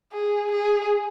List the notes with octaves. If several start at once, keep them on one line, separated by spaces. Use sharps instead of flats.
G#4
G#4